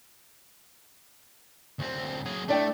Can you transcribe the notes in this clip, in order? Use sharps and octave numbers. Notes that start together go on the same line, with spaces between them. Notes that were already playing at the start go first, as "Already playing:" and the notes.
D2 C4
F#3 G#4
A3 D4 D5 G5